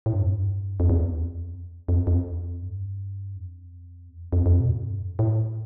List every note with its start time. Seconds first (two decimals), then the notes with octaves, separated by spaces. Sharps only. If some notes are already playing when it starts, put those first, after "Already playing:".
0.06 A2
0.13 G2
0.20 F2
0.28 G2
0.80 F2
0.90 E2
0.99 F2
1.88 F2
2.07 F2
2.62 G2
3.36 F2
4.09 E2
4.21 F2
4.33 F2
4.46 F2
4.60 B2
4.69 A2
4.82 G2
5.00 F2
5.19 A2